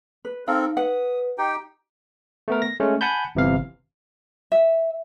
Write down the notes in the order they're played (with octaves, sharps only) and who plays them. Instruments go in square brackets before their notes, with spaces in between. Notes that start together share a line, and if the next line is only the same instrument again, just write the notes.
[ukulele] B4
[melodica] C4 A4 A#4 [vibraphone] D#4 [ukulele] F5
[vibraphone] B4 [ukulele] F#5 [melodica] D#6
[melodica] D#4 G4 G5
[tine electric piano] A3 B3 A#4
A#6
G#3 A3 C#4
F#5 G#5 A5 B5 G6
G1 C3 E3 F5
[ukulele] E5